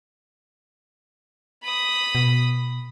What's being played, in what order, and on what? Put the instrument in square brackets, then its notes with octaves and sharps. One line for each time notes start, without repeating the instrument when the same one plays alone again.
[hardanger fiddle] B5 D#6
[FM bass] B2